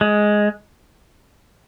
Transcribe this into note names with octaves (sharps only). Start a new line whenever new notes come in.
G#3